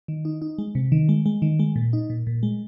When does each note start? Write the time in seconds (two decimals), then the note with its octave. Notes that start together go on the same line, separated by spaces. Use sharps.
0.08 D#3
0.25 D#4
0.42 D#4
0.58 G#3
0.75 C3
0.92 D#3
1.09 G#3
1.26 G#3
1.42 D#3
1.59 G#3
1.76 A#2
1.93 D#4
2.10 A#2
2.27 A#2
2.43 G#3